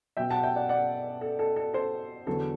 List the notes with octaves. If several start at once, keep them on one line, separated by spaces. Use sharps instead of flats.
B2 F#3 E5 G5
F#5 A5
E5 G5
D5 F#5
D5 F#5
A4
A4
A4
A4 C5
E2 D3 F#3 A4